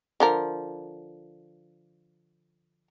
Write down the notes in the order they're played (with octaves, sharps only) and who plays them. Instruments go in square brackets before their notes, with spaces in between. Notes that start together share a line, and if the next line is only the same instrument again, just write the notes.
[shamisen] D3 F3 A#4